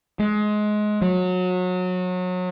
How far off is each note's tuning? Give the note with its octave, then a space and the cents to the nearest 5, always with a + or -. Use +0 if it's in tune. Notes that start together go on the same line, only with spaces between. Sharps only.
G#3 +20
F#3 -25